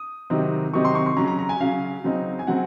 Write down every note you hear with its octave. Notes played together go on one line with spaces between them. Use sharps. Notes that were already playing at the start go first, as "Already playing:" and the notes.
Already playing: D#6
C3 D#3 F#3 C4 D#4
C3 D#3 F#3 C4 D#4 C#6
C6
C#6
C6
C#3 F#3 C#4 A#5
A#5
A#5
G#5
C#3 F#3 C#4 F5
C#3 F#3 C4 D#4
G#5
C#3 F#3 C4 F#5